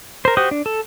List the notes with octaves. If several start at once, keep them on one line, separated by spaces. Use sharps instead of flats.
A#4 C5
F#4 G4 C5 D#6
D4
A4